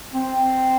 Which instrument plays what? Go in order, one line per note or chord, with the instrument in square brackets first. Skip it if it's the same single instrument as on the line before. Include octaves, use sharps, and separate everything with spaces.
[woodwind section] C4